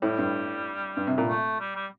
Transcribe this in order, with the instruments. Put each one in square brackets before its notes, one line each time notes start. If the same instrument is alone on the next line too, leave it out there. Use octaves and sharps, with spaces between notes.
[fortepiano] A2 [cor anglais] G3
[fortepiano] G2
G2
C3
A#2
[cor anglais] A3
G3
G3